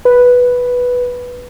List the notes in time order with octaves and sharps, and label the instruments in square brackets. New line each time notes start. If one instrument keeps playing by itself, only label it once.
[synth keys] B4